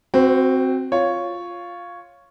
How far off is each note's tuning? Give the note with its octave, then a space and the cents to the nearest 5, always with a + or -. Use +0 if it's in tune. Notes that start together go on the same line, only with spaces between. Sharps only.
C4 +0 F#4 +0 C5 -45
F4 +0 C#5 +0